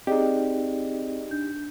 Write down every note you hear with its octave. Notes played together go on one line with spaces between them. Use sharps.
C4 D#4 G4 G#4 D5 D#5
D4 G6